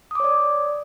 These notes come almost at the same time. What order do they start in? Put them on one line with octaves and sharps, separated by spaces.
D#6 D6 C#5 D5